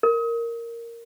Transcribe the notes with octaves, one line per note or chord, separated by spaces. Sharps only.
A#4